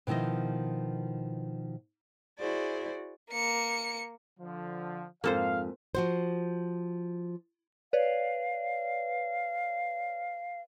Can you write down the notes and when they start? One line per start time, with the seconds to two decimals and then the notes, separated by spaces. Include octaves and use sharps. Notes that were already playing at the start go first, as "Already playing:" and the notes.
0.07 B2 D#3 F3 E4 D#5
2.40 E4 F#4 G#4 C5 D5
3.32 A#3 C#7
4.39 D3 F3
5.24 F2 G#2 A#3 A4 C5 F5
5.95 F3 F#4 C5
7.93 B4 C#5 D5 F5